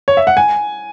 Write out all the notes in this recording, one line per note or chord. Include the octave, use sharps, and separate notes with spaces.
C#5
E5
F#5
G#5